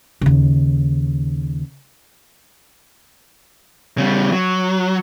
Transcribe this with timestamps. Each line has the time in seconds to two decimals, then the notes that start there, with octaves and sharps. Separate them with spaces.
0.21 D#2 C#3
3.98 C#3 G3
4.32 F#3